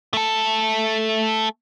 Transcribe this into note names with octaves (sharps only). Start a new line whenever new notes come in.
A3 A4